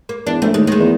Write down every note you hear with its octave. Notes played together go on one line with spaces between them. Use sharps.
A#3
E2 D4
A#1 A3
D#2 G#3
D#3 G#3
E2